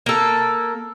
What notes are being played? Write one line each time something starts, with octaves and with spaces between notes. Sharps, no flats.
A#3 A4